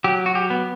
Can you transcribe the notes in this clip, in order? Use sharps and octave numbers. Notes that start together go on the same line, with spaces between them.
F#3 G4
F#4
G4
B3